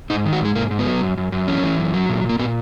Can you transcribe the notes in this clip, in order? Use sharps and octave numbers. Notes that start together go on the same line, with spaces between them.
G#2 D#4
D#3
F#4
G#2 G#3
G#2 A#3
G#2
B3
F#3
F#2
F#2
F#2
E3 C#4
E3
F#2
F#3
A#2
A#2
A#3
A#2 B3